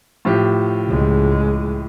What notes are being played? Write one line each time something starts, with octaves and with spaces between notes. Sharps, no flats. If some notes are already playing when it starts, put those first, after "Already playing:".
A2 F3 G4
C#2 G#3